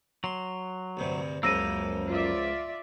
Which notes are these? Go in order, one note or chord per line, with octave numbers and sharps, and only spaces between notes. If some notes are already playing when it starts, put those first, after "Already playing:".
F#3 C6
D2 G2 C3
C#2 F#2 C#3 F3 A#3 E6 A#6 D#7
F4 D5 E5